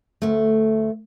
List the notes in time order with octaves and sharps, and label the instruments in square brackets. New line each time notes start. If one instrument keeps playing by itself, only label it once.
[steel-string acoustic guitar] D2 A3